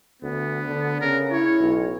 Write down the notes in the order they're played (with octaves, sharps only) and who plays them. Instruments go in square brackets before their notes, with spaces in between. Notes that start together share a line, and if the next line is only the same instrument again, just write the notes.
[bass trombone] D2 [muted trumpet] B3
[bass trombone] D3
[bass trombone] C#3 [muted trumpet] A#4
[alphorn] E4 [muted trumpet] C#5
[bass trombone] B1